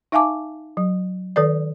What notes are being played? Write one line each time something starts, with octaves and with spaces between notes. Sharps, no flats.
D#4 E5 F5 G#5 A5 D6
F#3
D#3 A4 B4 D5